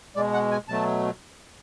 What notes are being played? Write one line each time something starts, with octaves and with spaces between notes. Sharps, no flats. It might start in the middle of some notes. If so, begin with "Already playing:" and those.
B2 G#3 D5
F#5
G#5
B2 F#3 A3 A5